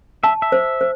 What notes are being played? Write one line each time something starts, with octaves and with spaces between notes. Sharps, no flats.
E5 A5
E5
C5
C5